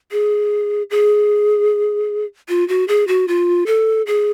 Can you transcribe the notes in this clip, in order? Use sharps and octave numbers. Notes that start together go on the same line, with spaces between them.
G#4
G#4
F4
F#4
G#4
F#4
F4
A4
G#4